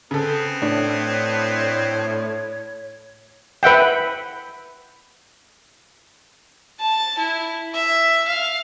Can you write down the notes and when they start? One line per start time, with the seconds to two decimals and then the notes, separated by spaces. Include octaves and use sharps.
0.11 C#3 B3 C4 A4
0.62 A2 D4 C#5
3.63 B4 E5 F#5 G5
6.80 A5
7.18 E4
7.74 E5
8.28 F5